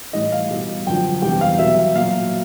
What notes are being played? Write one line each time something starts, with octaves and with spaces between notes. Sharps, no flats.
A2 E3 G3 D#5
F5
B2 G3
F#2 D3 F3 G5
E2 C3 E3 G3 G5
F5
B2 F#3 E5
A#2 F#3 F5